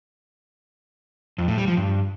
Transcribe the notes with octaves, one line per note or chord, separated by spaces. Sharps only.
F2
A2
G3
F3
G2